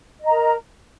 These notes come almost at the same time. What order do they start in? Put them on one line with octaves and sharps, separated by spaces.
D#5 A#5 A#4